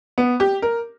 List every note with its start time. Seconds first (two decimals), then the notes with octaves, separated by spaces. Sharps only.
0.18 B3
0.40 G4
0.62 A#4